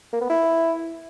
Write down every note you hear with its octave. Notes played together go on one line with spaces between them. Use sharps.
A#3
B3
E4